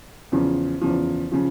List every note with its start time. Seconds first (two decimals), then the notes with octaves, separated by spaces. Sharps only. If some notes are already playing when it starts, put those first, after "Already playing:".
0.32 E2 C#3 F3
0.81 E2 C#3 F3
1.32 C#3 F3